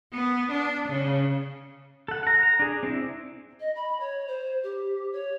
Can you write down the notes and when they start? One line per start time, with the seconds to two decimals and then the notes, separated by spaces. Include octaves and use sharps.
0.13 B3
0.51 D4
0.89 C#3
2.08 A4 F#5
2.23 F#5 A#5
2.43 A#5
2.59 D4 G#4
2.83 C4 D4 E4
3.60 D#5
3.75 B5
4.00 C#5
4.27 C5
4.63 G4
5.12 C#5